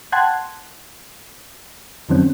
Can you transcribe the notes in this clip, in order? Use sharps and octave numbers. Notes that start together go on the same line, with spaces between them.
F#5 G5 A5 C6 F#6 G#6
F#2 D#3 F#3 C4 C#4